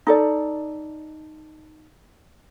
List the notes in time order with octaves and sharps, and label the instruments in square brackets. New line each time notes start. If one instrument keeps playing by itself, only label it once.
[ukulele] D#4 A4 D5